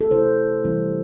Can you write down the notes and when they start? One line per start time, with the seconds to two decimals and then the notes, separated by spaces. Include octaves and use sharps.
0.01 A4
0.11 C3 A3 E4 C5
0.64 C3 E3 G3 C4 E4